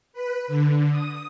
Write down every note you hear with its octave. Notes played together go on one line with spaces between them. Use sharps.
B4
D3
D#6